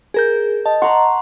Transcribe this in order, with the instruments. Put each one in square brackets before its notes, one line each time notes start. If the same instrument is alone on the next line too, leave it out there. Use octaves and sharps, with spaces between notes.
[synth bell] G#4 A#4 G6
[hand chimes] D#5 [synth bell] A5
[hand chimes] F#5 C6 [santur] A#5 C#6